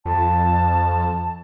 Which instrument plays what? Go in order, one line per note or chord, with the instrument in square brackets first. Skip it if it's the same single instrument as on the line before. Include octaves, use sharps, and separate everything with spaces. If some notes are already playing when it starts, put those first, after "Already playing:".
[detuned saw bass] F2 [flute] A5